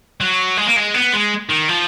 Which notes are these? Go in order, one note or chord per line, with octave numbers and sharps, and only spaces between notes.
F#3
G#3
A#3
G#3
B3
G#3
D#3
F3